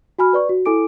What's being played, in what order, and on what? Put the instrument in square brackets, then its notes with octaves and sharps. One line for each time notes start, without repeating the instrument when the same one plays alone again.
[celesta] F#4 G#5 B5 F6
B4 D5 C#6
F#4
E4 A4 G#5 D6 D7